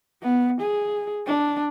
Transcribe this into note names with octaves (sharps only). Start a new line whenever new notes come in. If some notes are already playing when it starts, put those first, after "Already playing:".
B3
G#4
D4